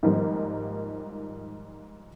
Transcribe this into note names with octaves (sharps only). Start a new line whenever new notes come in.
G#2 D#3 F3 G3 A#3